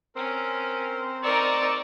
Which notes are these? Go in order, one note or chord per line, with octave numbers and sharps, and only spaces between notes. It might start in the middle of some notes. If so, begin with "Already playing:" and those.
C4 C#4 A#4
D#4 A#4 D5 C#6 E6